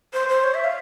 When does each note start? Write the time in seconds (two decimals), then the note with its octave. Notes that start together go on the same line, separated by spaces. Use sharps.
0.13 C5
0.29 C5
0.44 C#5
0.54 E5
0.64 F5